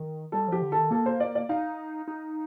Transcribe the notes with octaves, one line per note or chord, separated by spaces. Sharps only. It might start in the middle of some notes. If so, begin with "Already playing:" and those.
Already playing: D#3
G3 A4
F3 G4
D3
A4
D#3
A#3 A4
C5
D5
D5
D#4 F5
D#4